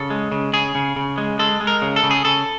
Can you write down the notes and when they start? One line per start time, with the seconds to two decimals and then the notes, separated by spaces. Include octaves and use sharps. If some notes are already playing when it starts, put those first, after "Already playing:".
Already playing: C#3 A4
0.10 G#3
0.32 C#3
0.53 C#3 G#4
0.75 C#3
0.96 C#3
1.18 G#3
1.39 G#3 A4
1.61 G#3
1.67 A#4
1.82 C#3
1.96 A4
2.03 C#3
2.11 G#4
2.25 C#3 A4